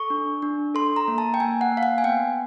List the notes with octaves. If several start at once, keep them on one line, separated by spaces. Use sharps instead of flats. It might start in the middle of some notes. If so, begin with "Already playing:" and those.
Already playing: A4 C#6
D4
D4
A4 C6
A#5
A#3
A5
G5
A#3 G#5
F#5
A#3
F5
F#5
G#5
B3 G5